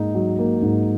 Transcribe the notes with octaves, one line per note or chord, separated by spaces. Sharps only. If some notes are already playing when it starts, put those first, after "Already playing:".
Already playing: G#2 A#3 D#4
F#3
A#3
G#2